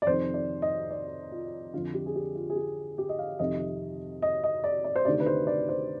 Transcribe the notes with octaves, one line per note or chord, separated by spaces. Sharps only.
D5
F2 C3 D#3 C5
D5
D#5
D5
F4
F2 D3 F4
G4
G#4
G4
F4
G#4
G4
G4
D#5
F5
F2 C3 D#3 D#5
D#5
D#5
D5
D5
C5
D2 C3 D#3 D5
B4
C5
D5
C5